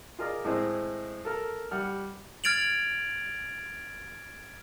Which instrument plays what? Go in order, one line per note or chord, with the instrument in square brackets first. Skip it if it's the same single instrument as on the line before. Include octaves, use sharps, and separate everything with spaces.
[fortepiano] F4 G#4 A#4 D5 D#5
A2 G#3 C4 D#5
A4 A#4
G3 F#5 F6
[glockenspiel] F6 G#6 A6 D7 F7 F#7